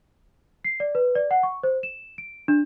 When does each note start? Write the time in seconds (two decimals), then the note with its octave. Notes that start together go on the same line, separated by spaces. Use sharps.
0.65 C7
0.80 D5
0.95 B4
1.15 D5
1.31 F#5
1.43 C#6
1.63 C5
1.83 E7
2.18 D7
2.48 D4